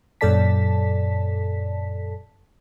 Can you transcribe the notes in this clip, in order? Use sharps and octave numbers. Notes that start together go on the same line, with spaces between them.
F#2 A#2 A4 D5 A5 B6